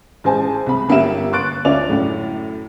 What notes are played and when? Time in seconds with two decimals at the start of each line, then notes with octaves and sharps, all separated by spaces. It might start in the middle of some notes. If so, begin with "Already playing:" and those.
0.24 A1 G#3 C5 G#5 A5
0.66 C2 B5
0.89 G1 A#3 C#4 G4 E5 E7
1.32 C6 C#6 F#6 A6 D7
1.65 D2 C#4 F4 D5 E5 F7
1.89 F#2 A2